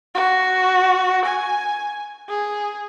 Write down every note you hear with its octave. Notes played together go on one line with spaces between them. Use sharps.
F#4
G#5
G#4